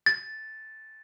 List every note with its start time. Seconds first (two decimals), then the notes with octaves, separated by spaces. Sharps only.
0.06 A6